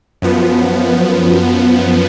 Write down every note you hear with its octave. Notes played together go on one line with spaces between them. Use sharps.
F#2 F3 B3